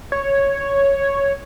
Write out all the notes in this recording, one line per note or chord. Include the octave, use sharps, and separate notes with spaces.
C#5